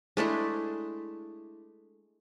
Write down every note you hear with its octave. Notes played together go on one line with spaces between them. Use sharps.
G#3 A3 D4 E4